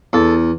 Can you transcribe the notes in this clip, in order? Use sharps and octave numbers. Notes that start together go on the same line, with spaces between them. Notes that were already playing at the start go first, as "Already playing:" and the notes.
E2 A4